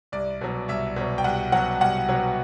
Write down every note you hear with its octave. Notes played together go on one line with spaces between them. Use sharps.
C2 D5
B2 F#3
C2 E5
B2 F#3
G5
C2 F#5
B2 F#3 F#5
C2 F#5
B2 F#3